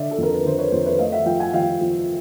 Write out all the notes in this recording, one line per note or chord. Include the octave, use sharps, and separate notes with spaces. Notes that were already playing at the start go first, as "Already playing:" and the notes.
Already playing: D3 D5 E5
A4
F2 A#4
B4
D3 C5
B4 C#5
F2 A#4 C5
B4 C#5
A3 D#5 F5
E5 F#5
F3 F5 G5
F#5 G#5
F3 F5 G5
F3